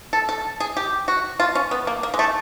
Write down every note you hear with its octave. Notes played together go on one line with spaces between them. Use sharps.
A4
A4
G#4
G4
F#4
F4
C#4
B3
A#3
A#3
G#3
A3